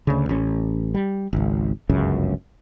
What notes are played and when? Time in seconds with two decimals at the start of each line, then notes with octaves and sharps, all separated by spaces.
0.07 D2 C#3
0.29 A1 C#4
0.95 G3
1.33 G#1 C#2
1.89 G1 C#2 F#2 C#3